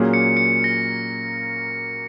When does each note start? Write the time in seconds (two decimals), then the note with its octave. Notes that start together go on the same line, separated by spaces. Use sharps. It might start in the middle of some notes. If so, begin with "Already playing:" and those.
Already playing: A#2 F#3 A#3 C#4 G#4
0.14 C#7
0.37 C#7
0.64 A#6